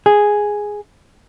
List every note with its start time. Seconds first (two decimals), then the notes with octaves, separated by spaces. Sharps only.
0.06 G#4